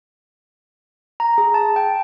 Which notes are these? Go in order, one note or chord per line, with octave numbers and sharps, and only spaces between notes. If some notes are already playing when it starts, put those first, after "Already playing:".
A#5
G#4
A5
G5